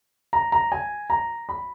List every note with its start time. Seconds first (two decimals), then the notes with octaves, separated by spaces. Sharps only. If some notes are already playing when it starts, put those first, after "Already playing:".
0.33 A#5
0.52 A#5
0.72 G#5
1.10 A#5
1.49 B5